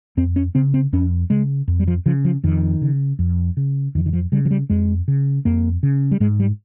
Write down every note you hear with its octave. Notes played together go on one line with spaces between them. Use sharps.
F2 C4
C#4
C#3 C4
C4
F2 C#4
C#3 G#3
F2
G3
F3
C#3 F3
F3
F2 D#3
C#3
F2
C#3
F2 D#3
D#3
F3
C#3 G3
F3
G3
F2 G#3
C#3
F2 A#3
C#3
G3
G#2 G#3
G3